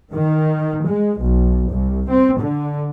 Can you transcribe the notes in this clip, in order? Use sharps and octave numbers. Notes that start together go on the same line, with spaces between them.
D#3
G#3
B1
C2
C4
D3